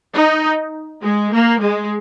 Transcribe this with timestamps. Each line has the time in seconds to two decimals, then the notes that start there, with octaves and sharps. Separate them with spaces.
0.14 D#4
1.02 G#3
1.32 A#3
1.60 G#3